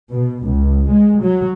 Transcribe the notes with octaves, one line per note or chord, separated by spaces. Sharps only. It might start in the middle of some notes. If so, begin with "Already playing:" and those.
B2
C#2
G#3
F#3